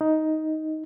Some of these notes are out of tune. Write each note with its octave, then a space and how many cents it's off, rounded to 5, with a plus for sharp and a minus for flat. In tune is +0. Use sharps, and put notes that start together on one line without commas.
D#4 +10